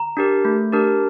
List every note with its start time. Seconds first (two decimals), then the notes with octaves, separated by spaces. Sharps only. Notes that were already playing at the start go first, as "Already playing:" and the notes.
Already playing: A#5
0.17 D4 G4 A#4
0.45 A3
0.72 D4 G4 A#4